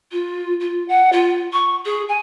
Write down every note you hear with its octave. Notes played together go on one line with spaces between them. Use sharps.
F4
F4
F#5
F4
C#6
G#4
G#5